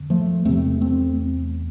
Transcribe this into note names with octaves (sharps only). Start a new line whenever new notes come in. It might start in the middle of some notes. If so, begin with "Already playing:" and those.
Already playing: F2 D3
F3 A3
E2 C3 A3 C4
A3 C4